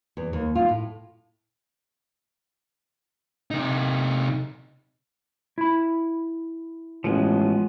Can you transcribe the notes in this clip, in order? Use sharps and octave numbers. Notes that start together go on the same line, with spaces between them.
E2
D#2
F4
A2
C3 D#4
E4 B5
A1 F3 G#3 B3